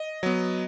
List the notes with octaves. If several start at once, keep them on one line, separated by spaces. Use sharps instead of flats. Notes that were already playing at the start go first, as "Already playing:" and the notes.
Already playing: D#5
F#3 B3